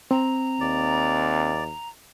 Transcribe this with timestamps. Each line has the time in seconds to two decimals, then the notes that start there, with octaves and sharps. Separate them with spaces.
0.11 C4 A#5
0.61 D#2 D5